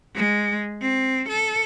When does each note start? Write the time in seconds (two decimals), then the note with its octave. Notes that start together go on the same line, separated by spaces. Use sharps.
0.15 G#3
0.82 C4
1.29 A4